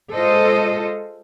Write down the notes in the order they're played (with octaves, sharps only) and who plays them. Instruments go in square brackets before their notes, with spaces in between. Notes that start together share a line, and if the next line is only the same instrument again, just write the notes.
[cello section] G#3 F4 A4 C5 D#5